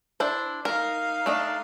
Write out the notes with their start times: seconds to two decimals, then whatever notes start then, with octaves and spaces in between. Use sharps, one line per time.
0.20 D4 E4 C5
0.65 D#4 A#4 F5
1.26 A3 D4 D#5